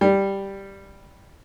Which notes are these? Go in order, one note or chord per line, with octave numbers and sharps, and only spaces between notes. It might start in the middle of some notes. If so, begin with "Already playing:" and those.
G3